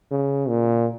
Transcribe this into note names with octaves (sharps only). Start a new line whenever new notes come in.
C#3
A#2